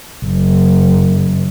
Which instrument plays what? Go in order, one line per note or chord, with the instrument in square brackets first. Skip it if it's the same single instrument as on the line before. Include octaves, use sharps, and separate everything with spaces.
[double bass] F#1